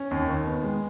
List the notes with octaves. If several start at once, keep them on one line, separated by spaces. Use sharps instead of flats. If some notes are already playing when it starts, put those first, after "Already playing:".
Already playing: C#4
D#2
D#3
B3
G#3